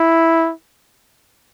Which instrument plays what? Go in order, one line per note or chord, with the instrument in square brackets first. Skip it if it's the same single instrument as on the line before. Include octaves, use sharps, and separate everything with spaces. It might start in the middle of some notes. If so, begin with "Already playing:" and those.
Already playing: [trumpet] E4